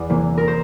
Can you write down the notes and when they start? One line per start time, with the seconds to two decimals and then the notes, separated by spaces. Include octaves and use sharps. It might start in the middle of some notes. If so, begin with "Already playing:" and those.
Already playing: E2 D5
0.10 C3 E3 A#3
0.38 A#4
0.48 C5